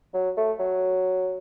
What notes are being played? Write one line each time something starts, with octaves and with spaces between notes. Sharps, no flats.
F#3
A3
F#3